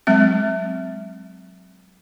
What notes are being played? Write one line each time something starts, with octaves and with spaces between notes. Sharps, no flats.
F#3 G#3 C4 E5